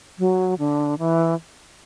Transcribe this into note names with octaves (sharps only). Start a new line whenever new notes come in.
F#3
D3
E3